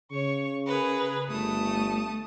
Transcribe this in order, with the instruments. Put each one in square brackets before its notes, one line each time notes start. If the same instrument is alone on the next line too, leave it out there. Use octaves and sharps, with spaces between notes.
[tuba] C#3 [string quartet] C#5 C#6
[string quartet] G#4 A#4 B4
[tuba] G1 [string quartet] A3 A5 D#6